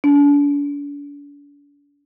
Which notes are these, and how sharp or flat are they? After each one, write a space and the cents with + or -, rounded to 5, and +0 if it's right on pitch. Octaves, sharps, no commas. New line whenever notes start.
D4 -40